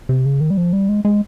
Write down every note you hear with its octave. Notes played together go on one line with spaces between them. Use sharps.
C3
C#3
D#3
G3
F3
G3
G#3
G#3